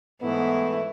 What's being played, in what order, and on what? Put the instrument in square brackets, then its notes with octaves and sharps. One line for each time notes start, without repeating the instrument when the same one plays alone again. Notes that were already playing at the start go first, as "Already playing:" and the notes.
[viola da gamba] G#2 E4 [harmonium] E3 A3 [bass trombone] B3